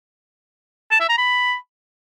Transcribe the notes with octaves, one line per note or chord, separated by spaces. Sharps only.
A5
E5
A#5
B5